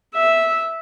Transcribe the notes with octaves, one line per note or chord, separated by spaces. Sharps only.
E5